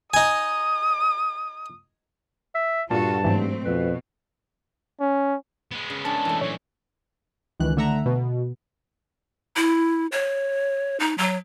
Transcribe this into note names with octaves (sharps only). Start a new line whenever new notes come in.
D#4 G#5 D#6
E5
G2 A#2 F4 F#4 A4 A5
G#2 E3 F#3 A3 C4
F2 B2 B4
C#4
G#3 B3
C#3
C#4 D4 A5
E3 A3
A#2 F#3 C#5
C#2 D#3 E3 F#6
D3 A3 E5 F#5 A#5
B2
E4
C#5
D#4
F#3